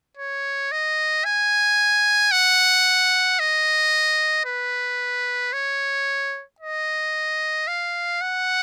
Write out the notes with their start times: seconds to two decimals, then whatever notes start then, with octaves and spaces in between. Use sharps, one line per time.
0.17 C#5
0.72 D#5
1.25 G#5
2.32 F#5
3.40 D#5
4.46 B4
5.53 C#5
6.60 D#5
7.68 F5
8.21 F#5